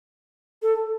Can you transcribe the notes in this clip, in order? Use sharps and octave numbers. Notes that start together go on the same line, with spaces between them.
A4